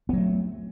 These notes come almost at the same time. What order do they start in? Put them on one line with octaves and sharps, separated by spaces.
B3 F#3 A3